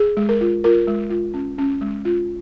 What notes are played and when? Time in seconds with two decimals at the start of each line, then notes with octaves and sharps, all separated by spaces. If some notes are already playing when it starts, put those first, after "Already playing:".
Already playing: G#4
0.17 G#3
0.29 A#4
0.41 F4
0.64 F4 A#4
0.87 G#3
1.10 F4
1.34 C#4
1.58 C#4
1.81 G#3
2.05 F4